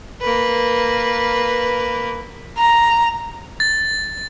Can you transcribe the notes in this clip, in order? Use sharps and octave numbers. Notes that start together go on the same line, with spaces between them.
A#3 B4
A#5
A6